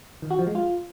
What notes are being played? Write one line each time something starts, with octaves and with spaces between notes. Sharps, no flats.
D#3
F#4
F3
G#3
F4